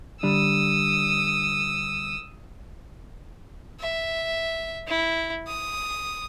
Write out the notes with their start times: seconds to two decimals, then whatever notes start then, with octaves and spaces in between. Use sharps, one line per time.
0.23 D3 G3 D4 D#6 E6
3.80 E5
4.87 E4
5.47 D#6